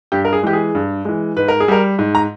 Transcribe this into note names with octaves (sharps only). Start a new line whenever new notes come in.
G2 G4
A#4
G#4
E3 G#3 G4
G#4
G2
E3 G#3
G#2 B4
A#4
G#4
G3 A#4
G#2
A#5